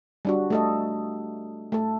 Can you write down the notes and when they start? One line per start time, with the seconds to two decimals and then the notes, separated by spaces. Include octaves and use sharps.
0.25 G3 D4 F#4
0.50 A3 A4 D#5
1.72 A3 A4